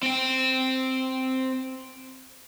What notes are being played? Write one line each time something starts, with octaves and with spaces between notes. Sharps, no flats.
C4 G5